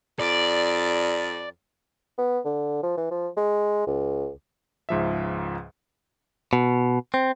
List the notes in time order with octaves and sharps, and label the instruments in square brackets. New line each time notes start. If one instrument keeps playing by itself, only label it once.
[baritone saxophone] F2 [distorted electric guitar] D5
[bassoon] B3
D3
F3
E3
F3
G#3
C#2
[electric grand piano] C#2 G#2 F3 E5
[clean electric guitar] B2
C4